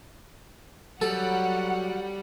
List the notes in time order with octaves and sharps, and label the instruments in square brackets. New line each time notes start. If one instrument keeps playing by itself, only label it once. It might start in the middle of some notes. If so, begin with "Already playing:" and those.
[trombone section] F#3 [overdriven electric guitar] G3 [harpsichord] A4 [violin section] F#5